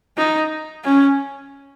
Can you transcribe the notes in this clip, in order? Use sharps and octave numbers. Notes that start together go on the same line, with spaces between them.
D#4
C#4